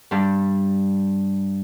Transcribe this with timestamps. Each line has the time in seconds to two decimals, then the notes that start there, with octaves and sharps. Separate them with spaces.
0.11 G2 G3